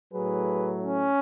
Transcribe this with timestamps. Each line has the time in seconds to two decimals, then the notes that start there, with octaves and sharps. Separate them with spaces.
0.14 A2 F#3 A3 G#4 B4
0.83 C#4